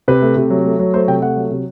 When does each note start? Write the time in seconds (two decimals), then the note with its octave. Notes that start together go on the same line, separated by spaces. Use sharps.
0.08 C3 B4
0.22 A3
0.36 C3
0.50 F#3
0.65 A3
0.79 F#3
0.94 A3 C5
1.08 C3 G5
1.22 A3 F#5
1.36 F#3
1.51 C3